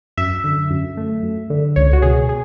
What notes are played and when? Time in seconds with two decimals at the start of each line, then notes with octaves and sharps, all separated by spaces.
0.17 F#2 E5
0.44 D3
0.71 F#2
0.97 A3
1.23 F#2
1.50 D3
1.76 C#2 C#5
1.93 F#4
2.02 B2 G#4
2.29 G#4